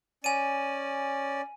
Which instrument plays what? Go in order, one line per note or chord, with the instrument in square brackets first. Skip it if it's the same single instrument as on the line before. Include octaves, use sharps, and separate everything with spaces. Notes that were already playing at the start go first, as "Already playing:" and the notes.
[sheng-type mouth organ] C#4 D5 [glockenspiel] G#5 D#7